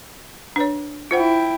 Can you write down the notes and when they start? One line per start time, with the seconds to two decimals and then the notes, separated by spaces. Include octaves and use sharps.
0.56 D4 B4 C#5
1.11 E4 F4 C5 F#5 G5